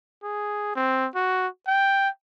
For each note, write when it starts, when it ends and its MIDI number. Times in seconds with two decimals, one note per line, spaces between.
0.23 0.72 68
0.76 1.07 60
1.15 1.47 66
1.67 2.09 79